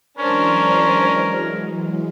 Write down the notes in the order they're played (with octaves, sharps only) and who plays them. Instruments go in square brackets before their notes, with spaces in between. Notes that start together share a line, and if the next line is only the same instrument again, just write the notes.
[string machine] E3 F#3 G#3 [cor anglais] C#4 [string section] D4 C5 [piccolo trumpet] A#4